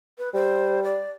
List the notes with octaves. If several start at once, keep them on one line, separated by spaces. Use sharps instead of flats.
B4
G3 C5
D5